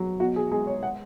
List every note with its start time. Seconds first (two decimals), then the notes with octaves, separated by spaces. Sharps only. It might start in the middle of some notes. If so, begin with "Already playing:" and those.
Already playing: F#3
0.20 B2 F#4
0.36 G#4
0.52 G#3 G#4
0.67 C#5
0.83 F#5